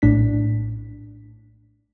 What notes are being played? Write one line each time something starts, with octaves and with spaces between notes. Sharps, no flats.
A#1 A2 D4 B6